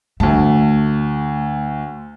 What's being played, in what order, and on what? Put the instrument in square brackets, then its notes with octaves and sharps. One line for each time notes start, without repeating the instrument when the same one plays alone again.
[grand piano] D2 A5 [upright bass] A3